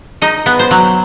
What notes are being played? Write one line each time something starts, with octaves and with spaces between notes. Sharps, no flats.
D#4 D#5
B3
C5
F#3